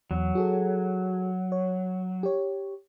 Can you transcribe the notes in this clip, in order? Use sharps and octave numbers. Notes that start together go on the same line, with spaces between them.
E2 F#3
F#4 G#4 A4
C#5
G4 C#5